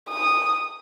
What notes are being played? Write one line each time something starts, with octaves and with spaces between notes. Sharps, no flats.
D#6